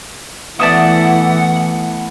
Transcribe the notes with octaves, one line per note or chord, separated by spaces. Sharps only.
E3 A3 B3 D5 E5 F#5 D#6